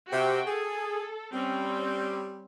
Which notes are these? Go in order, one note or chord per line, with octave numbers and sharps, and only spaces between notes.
C3 F#4 G4 G5
G#4 A4
G3 C4 C#4